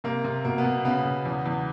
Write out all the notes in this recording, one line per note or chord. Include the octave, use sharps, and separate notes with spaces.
C3 A#3
C3
B2 A#3
B3
B2
C#3 B3
C#3
E2
E2